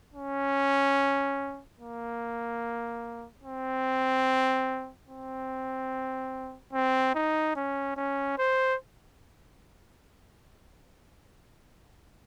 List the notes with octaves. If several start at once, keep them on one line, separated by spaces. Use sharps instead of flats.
C#4
A#3
C4
C4
C4
D#4
C#4
C#4
C5